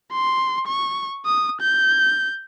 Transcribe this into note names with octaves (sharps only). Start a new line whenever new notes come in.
C6
C#6
D#6
G6